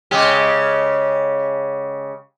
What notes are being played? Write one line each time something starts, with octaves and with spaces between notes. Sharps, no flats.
C#3 G#3 G4